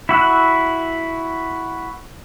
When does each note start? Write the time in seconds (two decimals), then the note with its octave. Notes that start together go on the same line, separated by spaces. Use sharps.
0.09 E4 F#4 E6 F#6